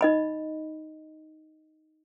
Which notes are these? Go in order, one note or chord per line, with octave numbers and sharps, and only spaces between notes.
D#4 D#5 B5